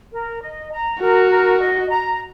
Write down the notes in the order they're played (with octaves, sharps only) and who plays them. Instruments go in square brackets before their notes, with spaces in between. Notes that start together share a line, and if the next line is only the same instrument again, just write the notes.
[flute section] A#4
D#5
A#5
[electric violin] F#4 [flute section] A#4
[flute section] A#4
D#5
A#5